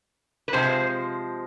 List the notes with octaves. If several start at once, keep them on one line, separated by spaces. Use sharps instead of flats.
B4
C3 F3 G#3 C5